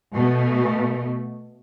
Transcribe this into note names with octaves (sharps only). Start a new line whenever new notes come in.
B2 A3